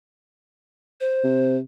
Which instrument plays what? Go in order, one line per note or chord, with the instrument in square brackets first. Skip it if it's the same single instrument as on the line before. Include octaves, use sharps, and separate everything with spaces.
[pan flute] C5
[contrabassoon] C3